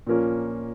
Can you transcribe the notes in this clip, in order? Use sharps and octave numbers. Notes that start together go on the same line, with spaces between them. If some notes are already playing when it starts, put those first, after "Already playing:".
A#2 F3 A#3 C#4